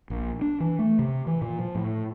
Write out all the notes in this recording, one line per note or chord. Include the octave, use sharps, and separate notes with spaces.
A#1
D4
E3
A3
C3
E3
A#2
F3
A2